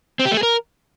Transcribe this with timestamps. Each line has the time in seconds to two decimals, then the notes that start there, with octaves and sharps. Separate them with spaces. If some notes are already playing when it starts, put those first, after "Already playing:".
0.19 C4
0.25 G4
0.31 A3
0.37 G#4
0.43 A#4